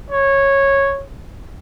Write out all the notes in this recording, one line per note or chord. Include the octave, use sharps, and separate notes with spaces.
C#5